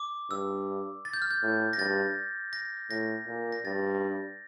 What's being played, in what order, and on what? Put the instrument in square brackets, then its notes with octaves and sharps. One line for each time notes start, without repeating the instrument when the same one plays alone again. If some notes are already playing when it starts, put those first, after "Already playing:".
Already playing: [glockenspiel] D6
[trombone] G2 [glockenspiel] E6
[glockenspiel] A6
G6
F6
G6
[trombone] A2
[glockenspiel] A#6
[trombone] G2 [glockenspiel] A6
[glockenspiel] A#6
[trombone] A2 [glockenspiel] A#6
[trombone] A#2
[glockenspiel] A#6
[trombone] G2 [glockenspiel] A6